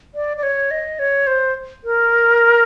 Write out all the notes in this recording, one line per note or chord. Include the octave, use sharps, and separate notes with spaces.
D5
D5
C#5
D#5
C#5
C5
A#4